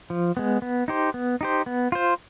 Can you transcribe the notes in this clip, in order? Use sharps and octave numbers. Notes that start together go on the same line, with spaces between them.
F3
G#3 B3
B3
D#4 G4 C5
B3
D#4 G4 C5
B3
F4 C5